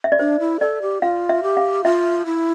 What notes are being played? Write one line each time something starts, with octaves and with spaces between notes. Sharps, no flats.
E5
D5
D4 C5
E4
A4 D5
G4
F4 F5
E5
G4
F5
F4 E5
E4